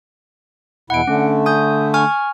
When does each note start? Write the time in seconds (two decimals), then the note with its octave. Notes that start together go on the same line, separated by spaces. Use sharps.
0.90 E2 B2 E4 F#5 D7
1.08 D3 A3 C#4
1.46 G#5 D#6 G6
1.94 G#5 C#6 F6